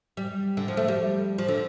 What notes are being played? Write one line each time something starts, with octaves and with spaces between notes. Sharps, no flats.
G3
D3
F3
A3
G3
F3
D3